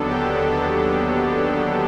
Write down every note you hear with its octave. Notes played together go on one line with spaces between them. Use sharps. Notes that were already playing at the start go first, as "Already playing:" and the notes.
Already playing: D#2 D3 F#3 B3 D4 A4
G4
A4